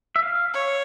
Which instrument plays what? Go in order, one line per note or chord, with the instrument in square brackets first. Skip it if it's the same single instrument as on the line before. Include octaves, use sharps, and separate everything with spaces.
[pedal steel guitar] E5
F5
[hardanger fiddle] C#5